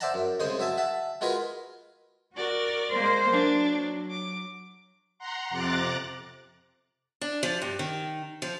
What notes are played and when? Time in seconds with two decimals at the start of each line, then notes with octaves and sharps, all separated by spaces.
0.01 C5 D5 E5 F#5 A5 A#5
0.14 F#2
0.40 C2 C#3 G#3 C5 D#6
0.59 F#3 E5 G#5 A5
0.78 E5 F#5 A5
1.21 G#3 F4 F#4 G#4 A#4 B4
2.37 F#4 A#4 D5
2.93 G#3 A#3 C5
3.32 F#3 D4
4.11 D6
5.19 F#5 A#5 C6
5.50 F2 C3 A#5 D6 F#6 A6
7.21 D4
7.43 F3
7.62 G2
7.79 D#3
8.42 F3